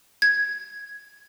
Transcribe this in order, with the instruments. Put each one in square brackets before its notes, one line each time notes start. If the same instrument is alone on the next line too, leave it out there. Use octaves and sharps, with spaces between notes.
[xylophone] G#6